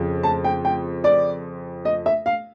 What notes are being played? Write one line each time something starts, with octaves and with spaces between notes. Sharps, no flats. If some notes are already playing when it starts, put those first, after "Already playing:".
Already playing: F2 C#3 F3
A5
G5
G5
D5
D#5
E5
F5